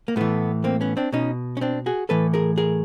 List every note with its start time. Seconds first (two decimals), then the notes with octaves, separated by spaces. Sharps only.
0.08 A#3
0.16 A2 E3 A3 B3
0.64 A#3 C4
0.81 B3 C#4
0.97 C4 D4
1.13 B2 C#4 D#4
1.57 C#4
1.61 C4 D4
1.86 F#4 G#4
2.09 A2 E3 A4 B4
2.34 G#4 A#4
2.58 G#4 A#4